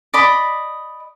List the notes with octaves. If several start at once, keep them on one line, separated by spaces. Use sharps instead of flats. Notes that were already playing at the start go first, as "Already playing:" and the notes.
D5 D#5 B5